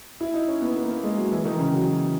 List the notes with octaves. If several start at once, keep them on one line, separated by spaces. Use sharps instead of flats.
E4
D#4
C#4
B3
A#3
A#3
G#3
F#3
E3
D#3
C#3
F#3